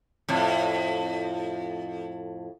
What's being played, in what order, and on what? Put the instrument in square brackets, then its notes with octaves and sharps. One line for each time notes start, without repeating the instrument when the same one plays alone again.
[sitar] F2 A2